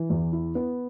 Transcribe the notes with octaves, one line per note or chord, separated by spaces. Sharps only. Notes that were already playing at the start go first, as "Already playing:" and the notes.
Already playing: E3
E2
E4
B3